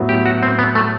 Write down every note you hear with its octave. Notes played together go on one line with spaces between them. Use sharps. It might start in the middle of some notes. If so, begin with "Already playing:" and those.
Already playing: A2 F#3 B3
G4
F#4
C4
B3
A3